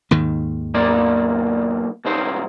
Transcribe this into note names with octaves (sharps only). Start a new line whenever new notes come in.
D#2 G#2 D#3
B1 A#3 D5
C2 G#2 C5